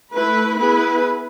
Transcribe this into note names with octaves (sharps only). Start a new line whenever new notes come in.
A3 E4 B4
B3 E4 G#4 B4